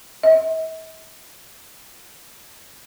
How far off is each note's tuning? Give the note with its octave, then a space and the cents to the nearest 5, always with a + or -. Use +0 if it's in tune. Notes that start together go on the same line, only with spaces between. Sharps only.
E5 -45